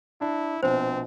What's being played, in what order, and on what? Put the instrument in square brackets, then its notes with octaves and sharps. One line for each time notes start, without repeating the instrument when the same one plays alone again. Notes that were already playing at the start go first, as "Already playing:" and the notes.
[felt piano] D4 [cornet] E4
[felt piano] A#1 B2 [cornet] C4 [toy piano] C5